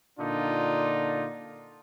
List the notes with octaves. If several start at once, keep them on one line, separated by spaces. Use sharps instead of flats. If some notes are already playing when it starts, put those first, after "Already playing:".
A#2 D3 D4 D#4 F4